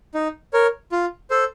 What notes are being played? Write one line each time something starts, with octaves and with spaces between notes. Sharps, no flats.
D#4
A#4 C#5
F4
A4 C5